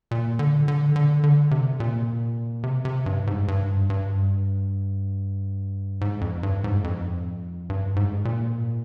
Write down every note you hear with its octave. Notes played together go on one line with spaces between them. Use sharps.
A#2
D3
D3
D3
D3
C3
A#2
C3
C3
G2
G#2
G2
G2
G#2
F2
G2
G#2
F2
G2
G#2
A#2